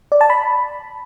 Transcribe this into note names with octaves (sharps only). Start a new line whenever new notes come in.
D5
A5
B5